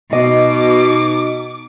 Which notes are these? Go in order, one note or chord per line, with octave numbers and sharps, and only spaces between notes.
B2 D#4 D#5 D6